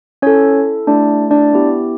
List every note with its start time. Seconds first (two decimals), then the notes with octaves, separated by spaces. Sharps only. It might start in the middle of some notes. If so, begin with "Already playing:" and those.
0.22 C#4 E4 A4 C#5
0.87 A3 D4 E4 G4 D5
1.31 D4 D5
1.53 B3 E4 G4